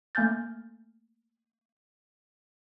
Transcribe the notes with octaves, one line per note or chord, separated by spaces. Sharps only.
A3 A#3 G#5 F6 G6 A6